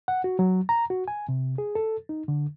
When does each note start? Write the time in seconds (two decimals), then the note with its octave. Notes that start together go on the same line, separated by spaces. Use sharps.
0.08 F#5
0.24 F#4
0.39 F#3
0.69 A#5
0.90 F#4
1.08 G#5
1.29 C3
1.58 G#4
1.75 A4
2.09 D#4
2.28 D3